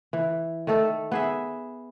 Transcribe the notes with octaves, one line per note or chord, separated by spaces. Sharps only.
E3
D#3 A3 A4
B3 G#4 E5